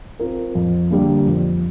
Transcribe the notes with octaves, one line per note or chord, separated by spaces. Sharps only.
C4 F4 A#4
F2
D3 G3 A#3 D4
F2